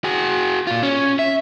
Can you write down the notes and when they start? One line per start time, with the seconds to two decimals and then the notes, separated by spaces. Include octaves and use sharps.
0.04 F#4 G#4
0.67 A#2 F4
0.83 C#4
1.19 E5